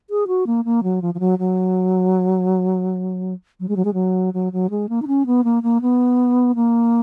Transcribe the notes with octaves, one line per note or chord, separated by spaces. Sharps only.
G#4
F#4
A#3
A#3
F#3
F3
F3
F#3
F#3
F#3
G#3
F#3
G#3
F#3
F#3
F#3
G#3
A#3
D#4
C#4
B3
A#3
A#3
B3
A#3